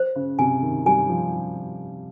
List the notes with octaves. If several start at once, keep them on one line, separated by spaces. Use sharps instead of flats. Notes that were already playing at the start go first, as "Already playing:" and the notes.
Already playing: C5
C#3
C3 G#5
D#3
G3 G#5
F3